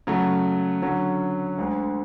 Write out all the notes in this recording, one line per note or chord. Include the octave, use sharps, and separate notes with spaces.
C#3 F#3 A3
D3 F#3 C#4
D2 D3 G#3